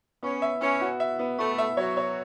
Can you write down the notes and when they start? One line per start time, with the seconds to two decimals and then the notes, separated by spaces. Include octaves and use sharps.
0.23 B3 C#4
0.42 E5
0.61 B3 C#4
0.81 F#4
1.00 E5
1.19 B3
1.38 A3 B3
1.58 E5
1.77 F#3 C#5
1.97 C#5